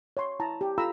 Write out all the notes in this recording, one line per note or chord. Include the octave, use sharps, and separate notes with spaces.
C#5 E5 C6
E4 A5 A#5
G4
F4 A4 F5 A#5 B5 E6